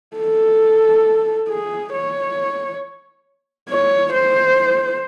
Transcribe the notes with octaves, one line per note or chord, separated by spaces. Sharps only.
A4
G#4
C#5
C#5
C5